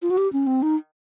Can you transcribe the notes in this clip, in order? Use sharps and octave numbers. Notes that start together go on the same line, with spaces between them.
F4
F#4
G4
C#4
C4
D#4